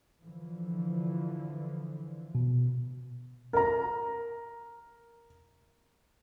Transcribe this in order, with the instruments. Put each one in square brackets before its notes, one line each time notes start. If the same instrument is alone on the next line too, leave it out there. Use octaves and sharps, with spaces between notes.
[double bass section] D3 E3 F3
[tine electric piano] B2
[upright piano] A#4 A#5